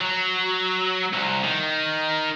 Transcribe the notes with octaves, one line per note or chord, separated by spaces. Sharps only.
F#3
C2
D#3